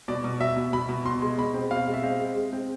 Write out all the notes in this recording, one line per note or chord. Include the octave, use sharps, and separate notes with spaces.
B2 D5
B2
B2 E5
B2
B2 B5
B2
B2 C6
G#3
B2 B5
C4
B2 F5
G#3
E5
C4 F5
G#3
G#3
C4